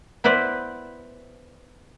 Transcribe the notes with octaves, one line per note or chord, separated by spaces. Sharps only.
B3 E4 B4 C5 D5